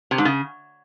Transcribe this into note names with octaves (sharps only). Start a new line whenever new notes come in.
C3
G#2
C#3